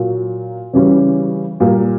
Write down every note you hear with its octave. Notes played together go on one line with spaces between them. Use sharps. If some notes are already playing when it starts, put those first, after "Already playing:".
Already playing: A#2 F#3 A#3
C#3 E3 G3 C#4
A#2 G3 A#3